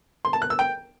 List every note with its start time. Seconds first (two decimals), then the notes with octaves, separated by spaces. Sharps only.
0.25 C6
0.33 A5
0.42 F#6
0.50 E6
0.59 G5